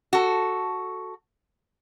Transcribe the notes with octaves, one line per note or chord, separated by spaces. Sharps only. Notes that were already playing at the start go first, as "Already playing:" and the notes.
F#4 A4